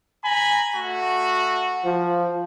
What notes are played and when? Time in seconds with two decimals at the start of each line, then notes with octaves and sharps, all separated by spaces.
0.24 G#5 A#5 B5
0.76 A3 F#4
1.85 F3